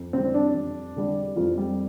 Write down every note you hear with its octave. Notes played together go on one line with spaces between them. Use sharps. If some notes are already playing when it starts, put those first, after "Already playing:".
Already playing: F2
D3 G3 C4
D4
F2
D3 G3
F2 F4
G3